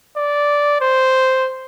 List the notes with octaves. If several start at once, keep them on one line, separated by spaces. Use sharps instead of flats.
D5
C5